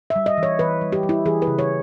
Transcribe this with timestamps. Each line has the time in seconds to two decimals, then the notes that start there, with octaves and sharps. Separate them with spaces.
0.10 E5
0.16 G3
0.26 D#5
0.38 E3
0.43 C#5
0.59 E3 B4
0.81 G3
0.92 G4
1.03 G3
1.09 E4
1.25 E3 G#4
1.42 B4
1.47 C#3
1.59 C#5